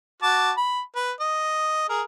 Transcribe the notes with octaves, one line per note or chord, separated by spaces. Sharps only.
F#4 A5 D6
B5
B4
D#5
G#4 A#4